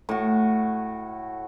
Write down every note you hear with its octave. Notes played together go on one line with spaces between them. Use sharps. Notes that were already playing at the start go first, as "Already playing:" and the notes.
A2 F#4